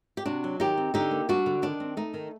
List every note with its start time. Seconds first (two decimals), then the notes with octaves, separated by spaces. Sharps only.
0.17 G4
0.26 C3 D4 F#4
0.44 F#3
0.60 D#3 D#4 G4
0.77 C4
0.94 D3 D#4 G4
1.11 A#3
1.29 G3 D4 F#4
1.46 D3
1.62 D#3 D4
1.80 C4
1.97 A3 D#4
2.14 D#3